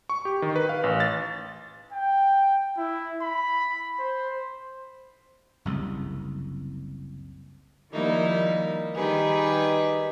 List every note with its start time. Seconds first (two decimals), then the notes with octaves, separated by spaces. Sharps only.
0.09 C#6
0.25 G4
0.42 D#3
0.56 B4
0.69 F5
0.84 A1
1.00 A6
1.93 G5
2.77 E4
3.22 B5
3.99 C5
5.65 F#1 C2
7.91 D#3 F3 G3 A#3 D#4 E4
8.95 D#3 G3 D#4 G4 G#4 B4